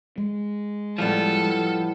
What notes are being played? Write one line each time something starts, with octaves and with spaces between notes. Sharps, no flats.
G#3
A2 F3 G3 B3 A4